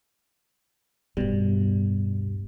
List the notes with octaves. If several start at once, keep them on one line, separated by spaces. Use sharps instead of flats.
D1 G2 B2 G3